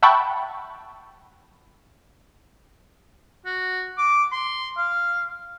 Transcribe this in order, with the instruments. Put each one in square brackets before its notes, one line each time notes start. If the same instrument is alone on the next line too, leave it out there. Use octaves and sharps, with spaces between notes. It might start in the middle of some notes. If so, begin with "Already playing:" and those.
[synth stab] E5 F#5 G5 A5 B5 C#6
[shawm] F#4
D6
C6
F5